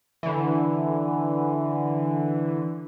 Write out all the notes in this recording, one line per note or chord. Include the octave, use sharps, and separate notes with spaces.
D3 E3